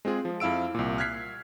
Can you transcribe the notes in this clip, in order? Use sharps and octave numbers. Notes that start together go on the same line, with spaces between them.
G#3 C4 F4 G#4
F3
F2 E4 F5 E6 D7
C2 A#2
F6 F#6 G#6 B6 C7